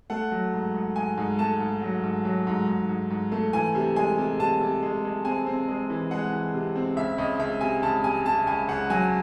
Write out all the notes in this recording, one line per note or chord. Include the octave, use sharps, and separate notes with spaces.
A3 F#5
F#3
G#2
G#2
G#2 G#5
G#2
A3 A5
G#2
F#3
G#2
F#3
G#2
G#2
G#2
G#2
A3
E3 G#5
C3
G#3 G#5
C3
C3 A5
C3
G#3
G#3
C4 G#5
C4
G#3
E3
G#3 F#5
E3
C3
C4
C#2 E5
C#2 D#5
C#2 E5
C3 G#5
C#2 A5
C3 G#5
C3 A5
C#2 G#5
C#2 F#5
F#3 G#5